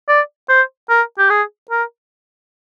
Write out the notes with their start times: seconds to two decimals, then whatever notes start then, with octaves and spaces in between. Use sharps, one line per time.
0.08 D5
0.49 C5
0.89 A#4
1.18 G4
1.30 G#4
1.71 A#4